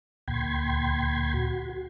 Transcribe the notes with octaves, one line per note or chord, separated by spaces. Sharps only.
D2 A#2 G5 B5 C6 G#6
F#4